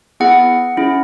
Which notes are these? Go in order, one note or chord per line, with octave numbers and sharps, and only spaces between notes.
B3 E4 G#4 F#5
C#4 E4 G#4